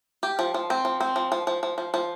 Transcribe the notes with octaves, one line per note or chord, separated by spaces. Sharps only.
G4
F3
F3
C4
F3
C4
F3
F3
F3
F3
F3
F3